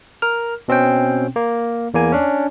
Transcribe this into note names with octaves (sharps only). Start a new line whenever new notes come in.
A#4 F6
B2 C4 C#4 G5
A#3
E2 A#3 G#5
C#4 D4